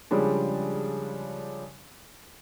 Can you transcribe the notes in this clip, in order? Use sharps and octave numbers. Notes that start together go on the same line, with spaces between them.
C#3 F3 G3 G#3 D4